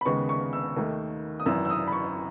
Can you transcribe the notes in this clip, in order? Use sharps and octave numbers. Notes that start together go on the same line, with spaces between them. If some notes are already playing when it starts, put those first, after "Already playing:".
B5
D#2 C#3 G#3 B3 C#6
C#6
E6
D#2 D#3 A3
D#6
G#1 F#2 E3 E6
E6
D#6
B5
C#6